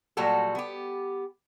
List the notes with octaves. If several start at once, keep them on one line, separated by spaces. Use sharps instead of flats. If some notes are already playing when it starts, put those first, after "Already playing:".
A#2 F#3 G3 F#4 A4
B3 G4